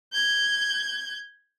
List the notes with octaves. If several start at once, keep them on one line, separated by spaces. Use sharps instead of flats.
G6 G#6